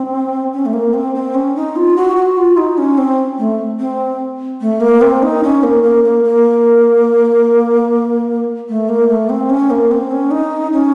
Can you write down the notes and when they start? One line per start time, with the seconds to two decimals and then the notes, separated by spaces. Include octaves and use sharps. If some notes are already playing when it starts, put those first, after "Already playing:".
Already playing: C4
0.54 C#4
0.66 A3
0.73 A#3
0.94 C4
1.15 C4
1.35 C#4
1.56 D#4
1.76 F4
1.96 F#4
2.17 F#4
2.37 F4
2.57 D#4
2.78 C#4
2.98 C4
3.38 A3
3.79 C4
4.61 A3
4.81 A#3
5.02 C4
5.23 D#4
5.43 C#4
5.63 A#3
5.83 A#3
6.04 A#3
6.24 A#3
8.69 A3
8.89 A#3
9.09 A3
9.30 C4
9.50 C#4
9.70 A#3
9.91 C4
10.11 C#4
10.31 D#4
10.73 C#4